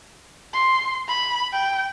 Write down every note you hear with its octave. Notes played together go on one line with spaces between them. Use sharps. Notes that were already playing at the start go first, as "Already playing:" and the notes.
C6
B5
G5